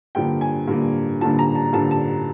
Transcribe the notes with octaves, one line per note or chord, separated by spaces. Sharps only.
G2 D3 F3 A#3 G5
G#5
G2 D3 F3 A#3
G2 D3 F3 A#3 A5
A#5
A5
G2 D3 F3 A#3 A5
A5